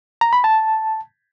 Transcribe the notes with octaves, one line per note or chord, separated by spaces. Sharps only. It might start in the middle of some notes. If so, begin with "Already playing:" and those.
A#5
B5
A5